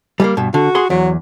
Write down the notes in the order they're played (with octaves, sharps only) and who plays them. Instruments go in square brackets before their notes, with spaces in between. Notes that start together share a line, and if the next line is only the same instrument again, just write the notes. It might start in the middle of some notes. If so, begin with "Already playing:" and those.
[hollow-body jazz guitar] G3 G#3 A#3
G2 B2
[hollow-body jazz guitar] D3 [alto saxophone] F#4
[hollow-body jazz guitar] G#4 F#5 C6
[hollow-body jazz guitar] E2 [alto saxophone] F#3